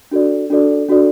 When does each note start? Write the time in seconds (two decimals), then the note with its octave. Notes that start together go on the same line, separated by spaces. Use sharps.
0.11 D4 F#4 A4 D5
0.50 D4 F#4 A4 D5
0.88 D4 F#4 A4 D5